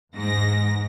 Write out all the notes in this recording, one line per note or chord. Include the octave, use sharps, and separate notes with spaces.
E2 G#2 A#6